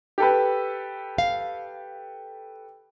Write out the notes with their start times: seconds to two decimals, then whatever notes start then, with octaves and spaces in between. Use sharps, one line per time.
0.18 G4 A4 B4
1.18 F5